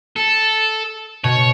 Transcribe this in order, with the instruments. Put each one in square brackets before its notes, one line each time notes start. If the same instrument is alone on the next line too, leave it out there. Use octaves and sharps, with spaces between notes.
[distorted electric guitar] A4
[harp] B2 [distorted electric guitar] C#5